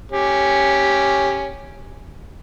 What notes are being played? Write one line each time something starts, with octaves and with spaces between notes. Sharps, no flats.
C#4 G4